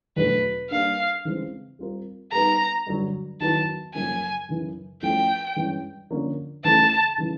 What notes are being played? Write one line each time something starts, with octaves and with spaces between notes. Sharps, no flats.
E2 B2 F#3 A3 D4 B4
G3 A#3 D4 F5
C#3 E3 G#3 C4
G3 C4 F4 A#4
G3 B3 D#4 A#5
G2 D3 F#3
D#3 F#3 B3 E4 A5
F#2 C#3 F3 A#3 C#4 G#5
F#2 C#3 E3
F3 A3 C#4 E4 G5
G2 E3 G#3 C#4
D3 F3 A#3 C#4
C#3 E3 A3 A5
C#3 E3